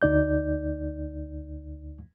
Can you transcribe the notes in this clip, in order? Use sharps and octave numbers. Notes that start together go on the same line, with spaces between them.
D2 D#4 D5 G6